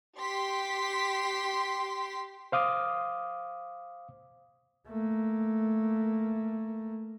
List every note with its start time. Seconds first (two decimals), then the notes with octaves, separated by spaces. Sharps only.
0.19 G4 C6 B6
2.52 C5 F5 D6 D#6
4.87 A3 A#3